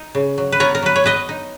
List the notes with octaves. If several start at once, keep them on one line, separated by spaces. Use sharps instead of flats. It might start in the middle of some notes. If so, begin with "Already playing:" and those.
Already playing: D#4
C#3
F#3
B4
B3 A#4 C#5
A#4
F#3 B4
C#5
F#3 B4 D#5
D#4